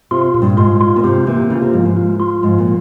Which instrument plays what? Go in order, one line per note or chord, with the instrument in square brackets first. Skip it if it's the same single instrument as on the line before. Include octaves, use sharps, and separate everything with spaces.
[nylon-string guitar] C3 [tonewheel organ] F4
[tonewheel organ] A#2
[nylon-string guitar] G2
[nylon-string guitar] G#2 [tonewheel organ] F4
[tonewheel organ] F4
[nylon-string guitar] A#2
[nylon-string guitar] C3 [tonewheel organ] G4
[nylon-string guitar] E3 [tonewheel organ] A#3
[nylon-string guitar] C#3 [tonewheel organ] F4
[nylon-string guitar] C3
[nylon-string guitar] G#2 [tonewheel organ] F3
[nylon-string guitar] G#2
[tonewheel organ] F4
F4
[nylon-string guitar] G#2 [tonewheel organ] F3
[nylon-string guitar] A#2